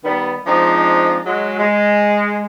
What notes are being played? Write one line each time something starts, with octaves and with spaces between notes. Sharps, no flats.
D#3 G3 B3
F3 G#3 C4 D4 D#4
F#3 G#3
G#3